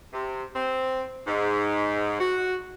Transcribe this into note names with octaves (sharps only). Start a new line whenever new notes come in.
C3
C4
G#2
F#4